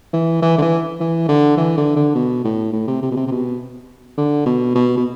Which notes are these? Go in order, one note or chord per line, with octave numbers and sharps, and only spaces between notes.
E3
E3
D3
E3
E3
D3
E3
D3
D3
B2
A2
A2
C3
C3
B2
C3
C3
B2
D3
B2
B2
B2